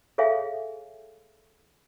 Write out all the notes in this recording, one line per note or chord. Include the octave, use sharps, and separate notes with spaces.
G#4 A4 C#5 E5 F5 G#5